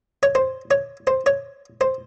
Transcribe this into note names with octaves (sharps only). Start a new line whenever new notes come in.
C#5
C5
C#5
C5
C#5
C5